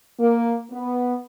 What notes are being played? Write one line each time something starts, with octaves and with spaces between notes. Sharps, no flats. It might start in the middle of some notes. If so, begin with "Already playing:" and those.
A#3
B3